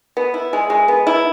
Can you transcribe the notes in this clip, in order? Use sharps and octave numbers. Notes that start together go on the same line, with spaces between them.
B3
E4
G#3
G#3
B3
E4